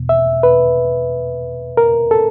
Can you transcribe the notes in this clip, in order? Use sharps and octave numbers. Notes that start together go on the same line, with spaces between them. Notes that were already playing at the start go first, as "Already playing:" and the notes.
Already playing: E2 B2
E5
B4
A#4
A4